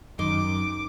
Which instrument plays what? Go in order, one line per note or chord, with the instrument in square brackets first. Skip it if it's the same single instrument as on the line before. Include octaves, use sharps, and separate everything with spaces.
[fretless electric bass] F#2 [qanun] D#3 C6 [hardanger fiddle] D6